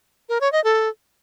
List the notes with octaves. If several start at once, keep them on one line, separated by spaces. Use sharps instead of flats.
A#4
C#5
D#5
A4